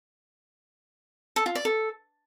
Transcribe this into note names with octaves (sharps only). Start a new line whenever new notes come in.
A4
F4
D5
A4